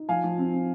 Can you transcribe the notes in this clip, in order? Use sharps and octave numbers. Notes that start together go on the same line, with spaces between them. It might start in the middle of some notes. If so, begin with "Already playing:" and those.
Already playing: D#4
F3 F5 G#5
F3
C4
C4